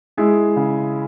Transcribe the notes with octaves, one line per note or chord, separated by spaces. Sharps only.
G#3 E4 G#4
C#3